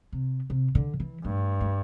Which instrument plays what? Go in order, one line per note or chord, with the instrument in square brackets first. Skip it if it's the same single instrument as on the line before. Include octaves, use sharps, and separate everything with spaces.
[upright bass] C3
C3
D3
E3
[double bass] G2 [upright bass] A3
[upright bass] A3